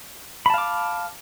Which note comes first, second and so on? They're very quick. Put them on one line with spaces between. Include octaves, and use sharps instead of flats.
B5 A5 F5 D6